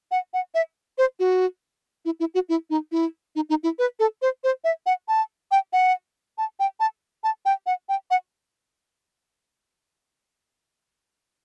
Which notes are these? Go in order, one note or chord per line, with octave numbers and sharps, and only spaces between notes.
F#5
F#5
E5
C5
F#4
E4
E4
F#4
E4
D#4
E4
D#4
D#4
E4
B4
A4
C5
C5
E5
F#5
A5
G5
F#5
A5
G5
A5
A5
G5
F#5
G5
F#5